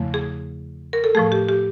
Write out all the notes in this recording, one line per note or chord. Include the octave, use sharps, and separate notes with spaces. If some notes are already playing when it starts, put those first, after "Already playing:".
Already playing: E2 C#3 F3 A3
G#4
A#4
A4
A2 F3 A3 G#4
G4
G4